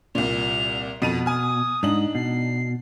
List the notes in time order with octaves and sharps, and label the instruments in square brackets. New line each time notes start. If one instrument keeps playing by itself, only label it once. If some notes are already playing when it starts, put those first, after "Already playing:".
[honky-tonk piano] C2 A#2 [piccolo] F7
[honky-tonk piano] F2 D#7 F7 [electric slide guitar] B2 [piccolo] A6
[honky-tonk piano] G#5 F6 [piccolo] D#6
[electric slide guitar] G#2 [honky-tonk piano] D4 D#4 F#7
[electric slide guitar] B2 [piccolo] C7